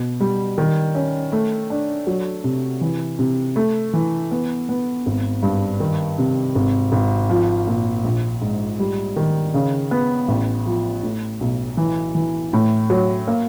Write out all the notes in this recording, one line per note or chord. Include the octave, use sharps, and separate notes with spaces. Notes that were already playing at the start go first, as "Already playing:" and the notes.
Already playing: B2
G3
D#3
C#4
A3
D4
F#3
C3
E3
C3
A3
E3
B3
B3
G#1
G2
D#3
C3
G#1
G#1
F3
A#2
A#1
G#2
G3
D#3
C#3
B3
A1
F3
A2
B1
E3
E3
A2
F#3
A#3